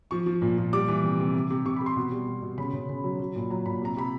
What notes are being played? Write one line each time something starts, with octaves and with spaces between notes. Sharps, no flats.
F3 C#6
F3
A#2
A#2
G3 D6
E3
C3
C3
C3
C3
C3 C#6
C3 B5
C6
B2
G3
B2
B2
C#3 B5
C#3
C#3
F#3
F#3
A#2
F#3 A#5
A#2 B5
C3 A#5
C3 B5